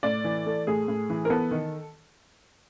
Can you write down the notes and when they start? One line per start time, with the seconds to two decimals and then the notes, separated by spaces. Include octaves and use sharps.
0.03 A2 D5
0.24 E3
0.46 A3
0.67 A2 G#4
0.88 A2
1.10 E3
1.25 A#4
1.30 B3 A4
1.51 D#3